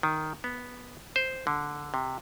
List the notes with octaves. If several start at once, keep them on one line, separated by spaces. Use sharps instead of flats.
D#3
B3
C5
D3
C3